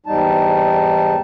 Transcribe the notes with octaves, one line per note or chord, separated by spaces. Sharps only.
E2 G#2 G3 D#4 A5